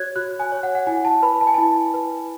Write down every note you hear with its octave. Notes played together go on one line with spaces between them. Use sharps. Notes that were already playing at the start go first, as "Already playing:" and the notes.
Already playing: F#4 C#5 F#6 G#6
F#4 F#6
G#5
C#5
F#5
F#5
E4 G#5
A5
B4 B5
A5
G#5
E4 A5
B4